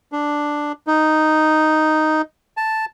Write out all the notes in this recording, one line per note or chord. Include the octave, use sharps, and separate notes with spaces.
D4
D#4
A5